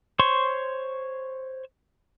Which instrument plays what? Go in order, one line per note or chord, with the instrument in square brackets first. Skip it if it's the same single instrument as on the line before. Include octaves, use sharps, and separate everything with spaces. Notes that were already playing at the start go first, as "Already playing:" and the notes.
[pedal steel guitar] C5 C#5 C6 C#6